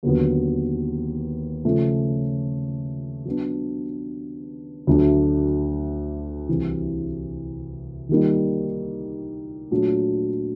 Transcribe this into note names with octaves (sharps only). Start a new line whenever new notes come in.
D#2 D3 F#3 B3
C#3 F3 A3 C#4
F#3 B3 D4
D2 D3 F#3 A3 D4
C2 C3 E3
D#3 G3 A#3 D#4
A#2 F#3 A3 D4